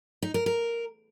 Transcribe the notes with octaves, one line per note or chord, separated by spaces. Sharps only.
D#4
A#4
A#4